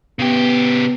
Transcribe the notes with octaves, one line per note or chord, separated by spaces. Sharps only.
C#3 B3 G4